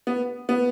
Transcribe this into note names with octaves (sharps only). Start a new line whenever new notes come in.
B3
B3